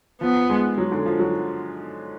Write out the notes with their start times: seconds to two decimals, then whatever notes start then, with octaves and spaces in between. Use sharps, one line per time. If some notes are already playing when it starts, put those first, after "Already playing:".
0.21 F3 B3
0.50 G#3
0.78 F#3
0.92 D3
1.06 F3
1.19 F#3